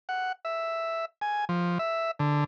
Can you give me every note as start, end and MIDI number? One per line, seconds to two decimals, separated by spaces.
0.09 0.32 78
0.45 1.05 76
1.21 1.45 80
1.49 1.78 53
1.79 2.11 76
2.19 2.44 50